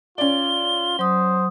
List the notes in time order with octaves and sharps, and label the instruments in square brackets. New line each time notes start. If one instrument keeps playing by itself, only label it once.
[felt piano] C#4 D5 [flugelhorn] F4 [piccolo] G7
[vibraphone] F#3 D#6 [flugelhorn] C5